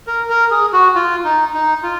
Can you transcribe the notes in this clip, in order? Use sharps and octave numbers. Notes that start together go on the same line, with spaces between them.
A#4
A#4
G#4
F#4
F4
D#4
D#4
F4